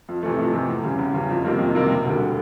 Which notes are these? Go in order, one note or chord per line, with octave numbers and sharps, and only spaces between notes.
F2
C3 E3 A3
F2
C3 E3 A3
E2
C#3 E3 G3
E2
C#3 E3 G3
F2
C3 D#3 G3 A#3
F2
C3 D#3 G3 A#3
E1
D2 D3 G3